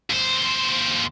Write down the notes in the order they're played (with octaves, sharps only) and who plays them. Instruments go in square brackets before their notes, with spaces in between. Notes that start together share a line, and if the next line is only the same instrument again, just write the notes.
[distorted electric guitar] D#2 C5